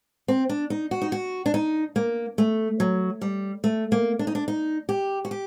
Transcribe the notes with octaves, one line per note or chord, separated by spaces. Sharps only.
C4
D4
D#4
F#4
D#4
F#4
D4
D#4
A#3
A3
F#3
G3
A3
A#3
D4
D#4
D4
D#4
G4
F#4
G4